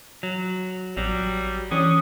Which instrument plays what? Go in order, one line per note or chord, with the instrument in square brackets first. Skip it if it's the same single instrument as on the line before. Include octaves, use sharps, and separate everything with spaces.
[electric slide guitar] F#3
[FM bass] A1 [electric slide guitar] F#3 [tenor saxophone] G3
[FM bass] E3 [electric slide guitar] C#4 [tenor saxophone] D4 [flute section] D#6